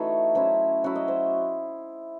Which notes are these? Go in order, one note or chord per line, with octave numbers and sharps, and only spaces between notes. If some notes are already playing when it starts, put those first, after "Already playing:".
Already playing: E3 A3 D#4 F#4 A4 C#5
F#3 C#4 E4 C5
F#3 C#4 E4 F#4
D#5
C5